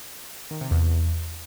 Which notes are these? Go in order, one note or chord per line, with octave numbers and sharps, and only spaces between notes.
D#3
C3
E2